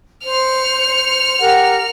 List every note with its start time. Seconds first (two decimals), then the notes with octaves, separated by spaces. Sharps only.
0.25 C5 F6 C#7
1.39 G4 A#4 F#5